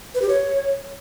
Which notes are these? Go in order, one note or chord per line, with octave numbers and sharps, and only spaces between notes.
B4
G4
C#5